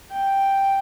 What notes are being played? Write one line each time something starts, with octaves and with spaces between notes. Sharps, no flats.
G5